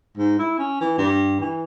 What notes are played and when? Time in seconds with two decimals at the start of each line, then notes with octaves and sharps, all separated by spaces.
0.17 G#2
0.39 E4
0.58 C#4
0.81 E3
0.98 G2
1.40 E3